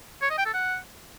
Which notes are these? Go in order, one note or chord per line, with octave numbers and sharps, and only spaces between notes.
C#5
D#5
G5
A4
F#5